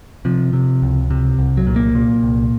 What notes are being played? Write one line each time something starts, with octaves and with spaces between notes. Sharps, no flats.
C3 F3
C3
C#2
C3
C2
F#3
A#2
A#3
A#2
C2